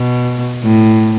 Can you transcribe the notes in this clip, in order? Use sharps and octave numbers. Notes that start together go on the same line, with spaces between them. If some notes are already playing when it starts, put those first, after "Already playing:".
Already playing: B2
A2